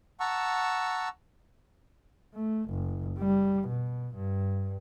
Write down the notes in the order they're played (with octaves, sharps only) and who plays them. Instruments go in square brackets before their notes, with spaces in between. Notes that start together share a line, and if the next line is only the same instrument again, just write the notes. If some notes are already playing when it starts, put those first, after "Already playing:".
[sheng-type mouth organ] F#5 A5 A#5 C#6 E6
[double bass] A3
F#1
G3
B2
G2